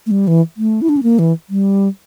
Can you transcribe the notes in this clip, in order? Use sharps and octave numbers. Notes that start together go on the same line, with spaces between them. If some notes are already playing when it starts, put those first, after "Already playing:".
A3
G3
E3
A3
E4
D4
C#4
A#3
E3
G3